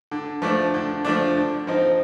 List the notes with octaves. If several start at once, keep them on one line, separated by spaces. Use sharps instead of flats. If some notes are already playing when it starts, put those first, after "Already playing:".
D3
F3 A3 D4
D3
F3 A3 D4
D3
F3 C4 D#4